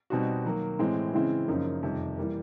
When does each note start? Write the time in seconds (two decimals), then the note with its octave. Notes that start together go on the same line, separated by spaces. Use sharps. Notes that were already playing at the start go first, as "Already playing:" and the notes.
0.10 B2 G3 C4 D#4 F#4
0.45 D#3 F#3 A#3
0.79 A2 E3 G#3 C4
1.14 C#3 E3 G#3 C4 E4
1.48 F#2 C#3 F3 A#3 D#4
1.83 F2 C3 D#3 G3
2.18 E3 G3 A#3